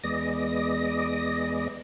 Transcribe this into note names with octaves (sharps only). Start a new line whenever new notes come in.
E2 G#3 B3 D5 D#5 A#6